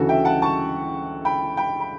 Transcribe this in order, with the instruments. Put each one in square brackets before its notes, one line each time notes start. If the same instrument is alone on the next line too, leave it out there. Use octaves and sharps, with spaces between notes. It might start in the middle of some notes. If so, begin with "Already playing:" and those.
Already playing: [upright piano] D2 C#3 E3 F#4 A4
E5 G5
F#5 A5
A5 C#6
G5 B5
G5 B5
B5